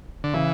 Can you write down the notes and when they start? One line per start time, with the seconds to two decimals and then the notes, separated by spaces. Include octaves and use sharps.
0.24 D3
0.34 C#3 E3